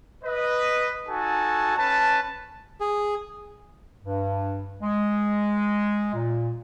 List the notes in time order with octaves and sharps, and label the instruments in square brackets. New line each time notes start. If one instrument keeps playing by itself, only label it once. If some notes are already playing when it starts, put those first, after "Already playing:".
[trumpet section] B4 D#5
D#4 F#4 A4 G#5 A5
C#4 B4 A5
[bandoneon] G#4
[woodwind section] G2
G#3
A#2